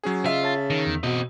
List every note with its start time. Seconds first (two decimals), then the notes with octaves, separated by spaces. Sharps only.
0.04 F#3 C#4 G#4
0.26 C#3 F4 D#5 E5 E6
0.43 C#5 A5 A6
0.70 D#3
0.87 E2
1.03 B2 C4 F#4 D#5